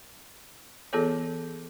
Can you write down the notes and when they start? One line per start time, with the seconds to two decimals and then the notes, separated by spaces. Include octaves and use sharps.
0.93 E3 B3 F4 G#4 A4 C#5